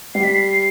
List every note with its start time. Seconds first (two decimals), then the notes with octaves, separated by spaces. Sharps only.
0.15 G3 C7
0.24 B6
0.34 C7